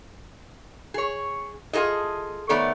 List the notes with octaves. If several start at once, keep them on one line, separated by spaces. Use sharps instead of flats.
G#4 C#5
F4 G#4 A4 D#5
D#3 A3 B3 A4 C#5 D5